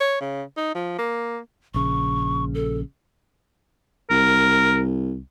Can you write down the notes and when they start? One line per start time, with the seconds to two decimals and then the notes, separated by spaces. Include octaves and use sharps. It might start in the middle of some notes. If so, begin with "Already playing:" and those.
0.01 C#5
0.21 C#3
0.57 D#4
0.75 F3
0.99 A#3
1.74 A#1 C#3 C#6
2.55 A4
4.10 C2 A#4